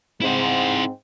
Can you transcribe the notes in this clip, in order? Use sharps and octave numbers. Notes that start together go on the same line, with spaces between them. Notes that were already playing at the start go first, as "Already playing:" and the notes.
G#2 C4 E4 C5